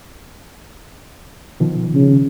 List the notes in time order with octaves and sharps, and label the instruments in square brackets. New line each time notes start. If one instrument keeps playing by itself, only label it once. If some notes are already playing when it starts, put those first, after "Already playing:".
[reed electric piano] B2 D#3 F3
[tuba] C#3